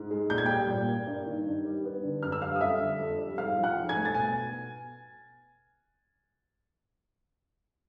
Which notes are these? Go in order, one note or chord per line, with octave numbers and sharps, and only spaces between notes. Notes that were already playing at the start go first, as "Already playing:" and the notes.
Already playing: G#2
G#3
A#2 G6
G#6
G3 G5 G6
A#2
A#3
G2
D#3
G2
G3
B3
D3
F#2 F6
E6
G3 F5 F6
D#6
F2 E5 E6
D3
F2
G3
G#2 F5 F6
F3
F#5 F#6
G#2
G#5 G#6
A3
A6
B2 G#5